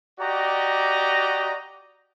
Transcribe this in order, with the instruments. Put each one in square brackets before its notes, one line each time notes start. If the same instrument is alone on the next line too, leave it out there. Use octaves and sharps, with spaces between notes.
[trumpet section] F#4 G4 D5 D#5 A#5